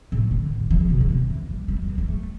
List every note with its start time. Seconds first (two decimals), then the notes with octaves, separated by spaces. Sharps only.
0.12 A2
0.31 D3
0.60 G3
0.71 E3
0.80 D3
0.90 B2
1.00 D3
1.10 B2
1.30 E3
1.49 G3
1.68 G3
1.82 E3
1.88 G3
1.98 G3
2.08 A3